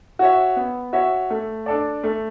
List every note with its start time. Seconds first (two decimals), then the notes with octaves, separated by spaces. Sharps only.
0.19 F#4 C#5 E5
0.56 B3
0.93 F#4 C#5 E5
1.30 A3
1.66 D4 A4 D5
2.03 A3